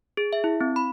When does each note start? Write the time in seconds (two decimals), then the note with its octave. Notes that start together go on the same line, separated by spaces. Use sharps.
0.17 G#4
0.33 E5
0.44 E4
0.61 C4
0.76 B5